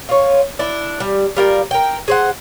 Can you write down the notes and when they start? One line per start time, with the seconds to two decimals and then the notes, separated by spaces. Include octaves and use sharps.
0.09 F4 C#5
0.59 D4 E4
1.00 G3
1.37 G3 F4 A#4
1.71 A#4 G5
2.08 G#4 C5 F#5